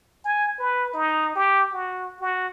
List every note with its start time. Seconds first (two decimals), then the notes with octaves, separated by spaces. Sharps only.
0.25 G#5
0.59 B4
0.94 D#4
1.35 G4
1.73 F#4
2.21 F#4